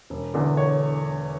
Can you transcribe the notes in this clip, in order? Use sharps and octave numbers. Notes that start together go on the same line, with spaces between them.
E1
E2 D3
C#5